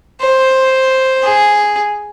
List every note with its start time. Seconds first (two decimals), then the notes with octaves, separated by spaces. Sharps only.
0.21 C5
1.24 G#4